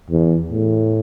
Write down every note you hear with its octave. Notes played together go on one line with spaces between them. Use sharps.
E2
A2